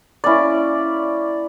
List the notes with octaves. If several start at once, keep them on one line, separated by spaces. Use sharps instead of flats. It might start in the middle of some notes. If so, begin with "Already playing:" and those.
A#3 C#4 E4 D5